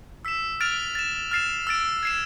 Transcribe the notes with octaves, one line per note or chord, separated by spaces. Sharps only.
E6 B6 E7
F6 A6 D7 F7
A6 E7
F6 A6 C7 E7
E6 A6 D7
G#6 C7 E7